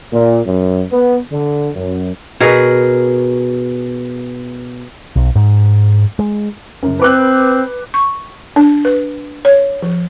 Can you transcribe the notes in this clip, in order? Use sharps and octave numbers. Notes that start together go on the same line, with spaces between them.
A#2
F#2
B3
D3
F#2
B2 G#4 A#4
B1
G#2
G#3
F#2 C#3
C4 B4 D6 F#6
C#6
D4
B4
C#5
F3